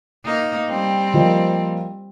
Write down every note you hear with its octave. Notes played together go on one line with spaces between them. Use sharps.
A#3 D#4
G3 C4
F3 A#3 F4 C5 D#5